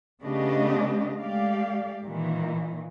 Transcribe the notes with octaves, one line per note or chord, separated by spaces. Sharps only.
C#3 A3 B3 D4 G4 D#5
G#3 A3 G4 D5 F5
A#2 D#3 E3